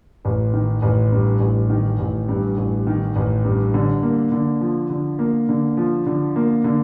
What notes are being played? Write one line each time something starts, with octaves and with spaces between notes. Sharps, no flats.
A1
D#3
A1
G2
A1
D#3
A1
G2
A1
D#3
A1
G2
D3
A#3
D3
F3
D3
A#3
D3
F3
D3
A#3
D3